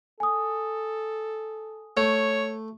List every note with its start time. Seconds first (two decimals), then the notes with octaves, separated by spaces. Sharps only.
0.20 A4 G#5 D#6
1.97 A3 C#5